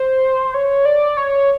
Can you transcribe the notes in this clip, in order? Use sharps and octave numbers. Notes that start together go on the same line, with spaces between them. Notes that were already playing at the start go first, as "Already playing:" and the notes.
Already playing: C5
C#5
D5
C#5